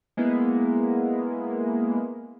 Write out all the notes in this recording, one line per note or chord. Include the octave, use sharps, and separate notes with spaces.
G#3 A#3 B3 E4